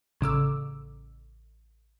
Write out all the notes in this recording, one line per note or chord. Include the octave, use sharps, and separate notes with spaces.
A1 C#3 D6 E6